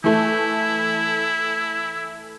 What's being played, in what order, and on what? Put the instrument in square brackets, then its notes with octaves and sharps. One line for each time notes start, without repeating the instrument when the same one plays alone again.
[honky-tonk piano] E3 A3 [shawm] E4